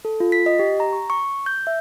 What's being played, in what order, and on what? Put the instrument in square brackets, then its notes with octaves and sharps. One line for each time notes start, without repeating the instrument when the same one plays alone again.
[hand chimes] A4
F4
B6
D#5
G4
A#5
C#6
C#6
G6
E5